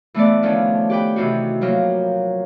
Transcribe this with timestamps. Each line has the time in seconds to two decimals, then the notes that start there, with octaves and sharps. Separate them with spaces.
0.14 E3 A3 B3 D5
0.43 D#3 F3 C#4 D4
0.90 G4 B4 G5
1.16 C3 D#3 E3 C4 F#4
1.61 F3 F#3 A#3